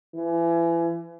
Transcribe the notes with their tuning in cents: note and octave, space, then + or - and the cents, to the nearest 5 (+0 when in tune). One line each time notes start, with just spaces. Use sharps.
E3 +30